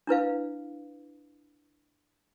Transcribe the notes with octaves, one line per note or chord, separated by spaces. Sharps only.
D4 E4 B4 F5